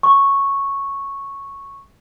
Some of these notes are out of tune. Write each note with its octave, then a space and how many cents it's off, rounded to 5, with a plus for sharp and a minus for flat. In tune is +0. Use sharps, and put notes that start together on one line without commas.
C#6 -5